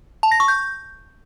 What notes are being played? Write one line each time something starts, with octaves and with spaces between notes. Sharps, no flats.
A5
A#6
C#6
G6